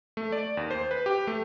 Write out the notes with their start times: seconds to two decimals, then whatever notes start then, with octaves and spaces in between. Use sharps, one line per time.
0.17 A3
0.32 D5
0.57 D#2
0.71 C5
0.91 B4
1.06 G4
1.27 A3